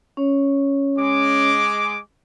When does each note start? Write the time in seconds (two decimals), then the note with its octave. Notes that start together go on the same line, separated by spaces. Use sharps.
0.17 C#4 C#5
0.98 G#3 D6